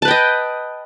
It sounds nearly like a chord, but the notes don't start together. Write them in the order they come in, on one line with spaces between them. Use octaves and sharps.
A5 B4 G5 D#5